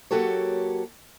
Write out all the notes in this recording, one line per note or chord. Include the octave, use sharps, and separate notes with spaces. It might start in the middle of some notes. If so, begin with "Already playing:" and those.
F#3 A#3 F#4 G4 A4 C#5